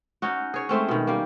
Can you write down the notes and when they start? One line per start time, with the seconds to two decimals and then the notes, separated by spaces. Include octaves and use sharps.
0.22 C#4 D#4 F#4
0.54 G#4 C#5
0.69 G#3 A3 C4 C#4
0.88 B2 D#3
1.07 G3 A#3